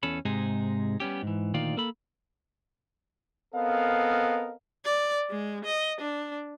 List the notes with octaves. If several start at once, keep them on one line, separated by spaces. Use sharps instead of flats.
E2 C#4 A4 B5
G#2 C3 G#3 D#4 G#4
G3 B3 C#4 G4
G#2 E3
D2 A#2 D#3 F4 D5 F5
A#3 A4 B5
B3 C4 A4 A#4 D#5 F5
D5
G#3
D#5
D4